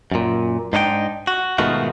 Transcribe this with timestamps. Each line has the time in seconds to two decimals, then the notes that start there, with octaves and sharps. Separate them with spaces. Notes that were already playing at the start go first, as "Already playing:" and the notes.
0.11 F#2 A#2
0.73 G#2 D4 D#4 C5 G5
1.27 F#4
1.58 G#2 B2 D#3 A3 F4 F#4